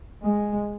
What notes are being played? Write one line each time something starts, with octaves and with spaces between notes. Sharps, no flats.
G#3